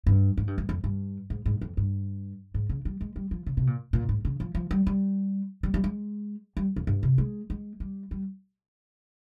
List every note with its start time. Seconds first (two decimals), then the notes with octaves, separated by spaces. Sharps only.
0.07 G2
0.37 G#2
0.47 G2
0.58 G2
0.69 F2
0.84 G2
1.30 G#2
1.46 G#2
1.61 F2
1.77 G2
2.54 G#2
2.69 C#3
2.85 G3
3.01 G#3
3.16 G3
3.31 F3
3.46 C#3
3.57 C3
3.67 A#2
3.93 A#2
4.09 G#2
4.25 C#3
4.40 F3
4.55 F3
4.71 G3
4.87 G3
5.63 G3
5.74 G3
5.84 G#3
6.57 G3
6.76 F2
6.87 G2
7.03 C3
7.18 G#3
7.50 G#3
7.80 G3
8.11 G3